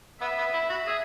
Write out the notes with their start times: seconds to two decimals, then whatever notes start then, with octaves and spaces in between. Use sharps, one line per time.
0.21 B3 E5
0.38 B3
0.53 E4
0.70 F#4
0.86 G#4